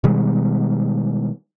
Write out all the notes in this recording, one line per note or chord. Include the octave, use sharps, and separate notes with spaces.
B2 D#3 G3 G#3